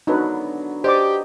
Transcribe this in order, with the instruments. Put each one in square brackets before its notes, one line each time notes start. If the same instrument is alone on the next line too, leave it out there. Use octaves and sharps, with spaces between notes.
[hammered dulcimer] D3 F#3 B3 [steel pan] D#4 B4
[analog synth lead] G4 [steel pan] C5 D5 D6 [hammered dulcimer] D#5